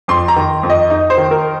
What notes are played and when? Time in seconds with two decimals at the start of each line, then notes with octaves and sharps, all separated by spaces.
0.08 F2 C6
0.28 A#5
0.36 D#3
0.63 F2
0.70 D#5
0.90 D#4
1.10 C5
1.18 D#3
1.31 A#4